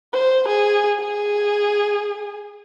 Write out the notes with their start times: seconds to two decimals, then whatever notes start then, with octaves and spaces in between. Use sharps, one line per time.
0.13 C5
0.48 G#4
0.99 G#4